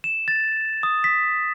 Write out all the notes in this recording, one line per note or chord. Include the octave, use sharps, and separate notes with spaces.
E7
A6
D#6
B6